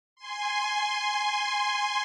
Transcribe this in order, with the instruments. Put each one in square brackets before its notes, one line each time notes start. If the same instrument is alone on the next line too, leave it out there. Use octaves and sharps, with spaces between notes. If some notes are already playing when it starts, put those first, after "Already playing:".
[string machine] G#5 C6